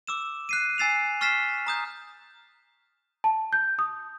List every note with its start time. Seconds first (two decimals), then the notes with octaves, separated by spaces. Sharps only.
0.07 D6 E6 E7
0.49 F#6 C7 D#7
0.78 G#5 E6 A6 C7 E7 F7
1.21 C#6 F6 A6 B6 C7 E7
1.67 A#5 D#6 G6
3.24 A5
3.53 G6
3.79 D#6